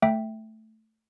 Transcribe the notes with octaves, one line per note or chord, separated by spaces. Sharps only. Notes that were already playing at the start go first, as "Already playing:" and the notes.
A3 E5 G5